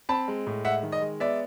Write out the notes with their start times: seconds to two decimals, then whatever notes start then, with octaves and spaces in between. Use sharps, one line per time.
0.09 C4 A5 B5
0.28 G#3
0.47 A2
0.65 G#3 E5 F#5
0.83 D#3
0.92 D#5
1.01 G#3
1.20 B3 D5 E5